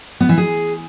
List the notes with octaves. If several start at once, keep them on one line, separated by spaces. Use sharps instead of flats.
B3
E3
G#4